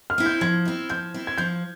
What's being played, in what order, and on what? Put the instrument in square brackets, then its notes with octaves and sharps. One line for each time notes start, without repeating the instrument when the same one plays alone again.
[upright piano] F6
[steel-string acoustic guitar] C4 E4
[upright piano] G6
[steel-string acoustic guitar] F3 [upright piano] G#6
[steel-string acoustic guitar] C4 E4
[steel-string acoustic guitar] F3 [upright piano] G6
[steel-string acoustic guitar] C4 E4
[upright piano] G#6
[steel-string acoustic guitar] F3 [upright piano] G6